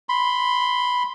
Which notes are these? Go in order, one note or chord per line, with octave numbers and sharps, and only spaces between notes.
B5 C6